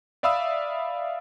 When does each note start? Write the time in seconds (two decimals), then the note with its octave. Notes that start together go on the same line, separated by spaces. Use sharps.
0.23 D5 E5 F5 B5 D#6 E6